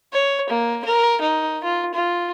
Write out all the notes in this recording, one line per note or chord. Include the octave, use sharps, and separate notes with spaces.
C#5
A#3
A#4
D#4
F4
F4